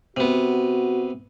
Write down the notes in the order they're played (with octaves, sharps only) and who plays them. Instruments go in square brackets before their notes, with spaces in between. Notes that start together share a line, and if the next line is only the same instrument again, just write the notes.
[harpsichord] C3 B3 [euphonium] F#4